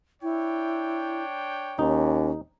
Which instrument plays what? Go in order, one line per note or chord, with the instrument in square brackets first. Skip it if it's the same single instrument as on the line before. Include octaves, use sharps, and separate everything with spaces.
[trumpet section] D4 C#5 G5 [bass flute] E4
[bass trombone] D#2 [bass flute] C#4 [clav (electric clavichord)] D#4